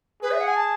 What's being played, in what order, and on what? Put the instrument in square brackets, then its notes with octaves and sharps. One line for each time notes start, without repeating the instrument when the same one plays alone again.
[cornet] G#4 [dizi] B4
[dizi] E5
F#5
G#5
A5